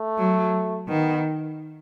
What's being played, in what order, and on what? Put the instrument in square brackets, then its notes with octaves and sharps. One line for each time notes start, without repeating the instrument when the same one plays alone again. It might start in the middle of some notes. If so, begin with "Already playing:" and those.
Already playing: [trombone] A3
[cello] F#3
[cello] D#3 [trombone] B3